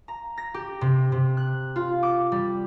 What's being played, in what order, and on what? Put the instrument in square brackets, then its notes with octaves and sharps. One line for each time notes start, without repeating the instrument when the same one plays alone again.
[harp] A#5
A#6
G4
C3
C3
F#6
F4
D6
G3